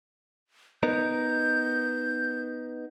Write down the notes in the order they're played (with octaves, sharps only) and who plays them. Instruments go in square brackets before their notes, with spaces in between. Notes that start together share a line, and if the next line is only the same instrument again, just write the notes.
[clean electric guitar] B3 D#4 A#4 [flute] G6